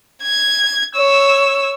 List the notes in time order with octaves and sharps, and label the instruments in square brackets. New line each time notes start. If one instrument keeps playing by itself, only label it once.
[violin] G#6
C#5 E6